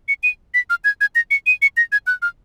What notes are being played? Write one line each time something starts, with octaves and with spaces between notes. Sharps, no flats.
C#7
D#7
B6
F6
G#6
G#6
A#6
C#7
D#7
C#7
A#6
G#6
F#6
F6